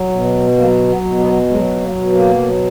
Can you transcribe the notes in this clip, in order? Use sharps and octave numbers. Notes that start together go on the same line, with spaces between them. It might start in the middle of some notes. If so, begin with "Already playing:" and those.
Already playing: F#3
B2
F#3 A#3
B3
B2
B3
F#3 G#3
A#3
B2
A#3
F#3